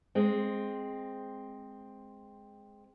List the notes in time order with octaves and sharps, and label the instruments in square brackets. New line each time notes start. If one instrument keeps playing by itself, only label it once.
[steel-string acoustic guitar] G#3 C4